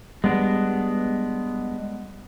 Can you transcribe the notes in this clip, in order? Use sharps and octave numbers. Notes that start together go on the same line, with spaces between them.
G3 G#3 B3 D4